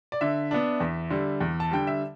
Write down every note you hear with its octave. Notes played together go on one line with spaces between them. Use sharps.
D5
D3 E5
B3 D4
E2
D3 G3
E2
A5
D3 G3 G5
E5